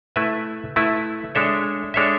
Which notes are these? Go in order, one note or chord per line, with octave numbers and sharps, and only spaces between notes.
A3 E4 B4 E5
A3 E4 B4 E5
G#3 D4 A4 C#5 E5
G#3 D4 A4 C#5 E5